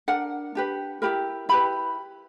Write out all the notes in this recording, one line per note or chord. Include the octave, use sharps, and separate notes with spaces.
D4 A#4 F#5
D4 G4 B4
E4 G4 A#4 B5
E4 G4 B4 B5